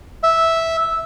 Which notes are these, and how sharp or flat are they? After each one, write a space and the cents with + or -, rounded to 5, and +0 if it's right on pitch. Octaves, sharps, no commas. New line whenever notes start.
E5 -5